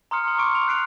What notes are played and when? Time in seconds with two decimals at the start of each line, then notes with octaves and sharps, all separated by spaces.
0.11 A#5 C6 D#6 F6 C#7
0.24 C6 F6
0.38 C#6 D6 C#7 D7
0.55 F7
0.68 F#6 C7 D7 F7